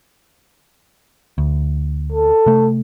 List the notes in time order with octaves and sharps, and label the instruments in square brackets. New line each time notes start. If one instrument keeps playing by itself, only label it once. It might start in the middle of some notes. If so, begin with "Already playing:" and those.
[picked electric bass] D2
[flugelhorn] A4
[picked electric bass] C3 A3